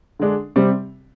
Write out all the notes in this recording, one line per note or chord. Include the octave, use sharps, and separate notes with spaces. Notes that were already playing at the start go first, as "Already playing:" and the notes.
D3 G#3 D4
C3 G3 C4 G4